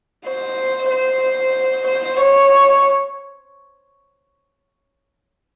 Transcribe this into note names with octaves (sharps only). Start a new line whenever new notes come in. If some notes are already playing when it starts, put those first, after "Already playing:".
C5
C5
C5
C#5